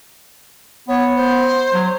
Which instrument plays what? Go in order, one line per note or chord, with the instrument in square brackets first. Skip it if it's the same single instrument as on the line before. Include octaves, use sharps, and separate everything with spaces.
[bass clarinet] B3 [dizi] C#5
[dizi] C5
[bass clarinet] F#3